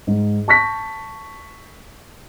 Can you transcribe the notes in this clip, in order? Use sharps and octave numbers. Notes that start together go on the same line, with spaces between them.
G#2
A5 C#6 A#6 B6